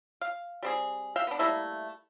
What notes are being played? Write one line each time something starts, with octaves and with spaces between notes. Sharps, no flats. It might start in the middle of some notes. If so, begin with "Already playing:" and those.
F5
G3 C4 G#4
E5 F5 G5
B3 D4
G3 A3 A#3 E4